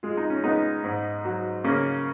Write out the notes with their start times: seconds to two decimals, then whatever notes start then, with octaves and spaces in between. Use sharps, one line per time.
0.03 G#3 F4
0.17 D#4
0.30 C#4
0.44 G#3 B3 D#4
0.84 G#2
1.25 F#3
1.64 C#3 A#3 C#4